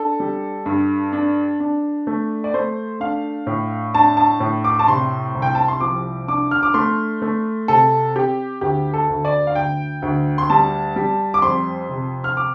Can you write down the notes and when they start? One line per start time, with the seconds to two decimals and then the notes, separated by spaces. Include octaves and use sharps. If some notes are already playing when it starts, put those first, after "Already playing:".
Already playing: D4 A4
0.20 G3
0.66 G2
1.13 D4
1.60 D4
2.07 A3
2.44 D5
2.54 A3 C5
3.00 D4 F5
3.47 A2
3.94 D4 A5
4.17 A5
4.40 A2
4.64 D6
4.79 A5
4.88 C3 C6
5.35 C2
5.42 G5
5.55 A5
5.68 C6
5.81 F3 D6
6.28 D4 D6
6.51 F6
6.63 D6
6.74 A3 C6
7.22 A3
7.68 C3 A4
8.15 C4 G4
8.61 D2 G4
8.94 A4
9.09 D2
9.25 D5
9.47 F5
9.55 D2 G5
10.02 D2
10.38 C6
10.50 G3 A5
10.96 G3
11.34 D6
11.42 F2 C6
11.89 C3
12.24 F6
12.37 D6